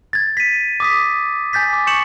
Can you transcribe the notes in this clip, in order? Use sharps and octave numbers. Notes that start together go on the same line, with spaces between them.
G#6 A6
B6 D#7
D6 D#6 B6
G#5 G6 A6 B6
D6
C#6 G6 C#7 E7 F#7